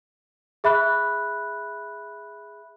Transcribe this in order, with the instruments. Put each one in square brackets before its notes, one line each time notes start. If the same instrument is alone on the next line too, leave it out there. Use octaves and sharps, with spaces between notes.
[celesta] G#4 E5 B5 F#6